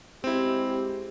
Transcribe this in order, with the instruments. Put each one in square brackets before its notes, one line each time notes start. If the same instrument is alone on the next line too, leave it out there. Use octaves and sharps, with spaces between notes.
[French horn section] G#3 G4 [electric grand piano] C4 E4